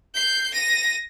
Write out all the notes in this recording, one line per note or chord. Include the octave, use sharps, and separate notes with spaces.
G6 C7
A#6 D#7